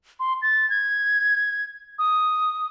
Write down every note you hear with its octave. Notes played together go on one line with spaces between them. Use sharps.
C6
A6
G#6
D#6